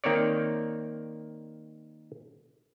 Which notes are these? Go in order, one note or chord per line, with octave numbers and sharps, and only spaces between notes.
D#3 A#3 C4 C#5 D5